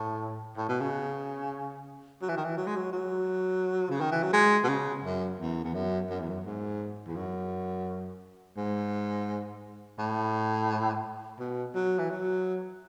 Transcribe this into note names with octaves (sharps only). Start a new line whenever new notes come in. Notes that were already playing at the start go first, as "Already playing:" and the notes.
Already playing: A2
A2
B2
C#3
F#3
E3
D#3
E3
F#3
G#3
F#3
F#3
C#3
D#3
E3
F#3
G#3
B2
C#3
F#2
E2
E2
F#2
F#2
E2
F#2
G#2
E2
F#2
G#2
A2
B2
F#3
E3
F#3